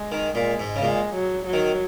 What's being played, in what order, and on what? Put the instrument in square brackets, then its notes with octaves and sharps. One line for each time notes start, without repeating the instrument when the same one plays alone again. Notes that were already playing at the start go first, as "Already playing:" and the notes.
Already playing: [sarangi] G#3
[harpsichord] D#3
[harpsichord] A#2 [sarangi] G#3
[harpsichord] G#2
C#3
[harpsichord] A#2 [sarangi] G#3
[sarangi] F#3
F#3
[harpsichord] D#3